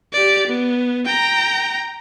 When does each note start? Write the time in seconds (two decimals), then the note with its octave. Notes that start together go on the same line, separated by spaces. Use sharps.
0.13 G4 D5
0.47 B3
1.06 G5 A#5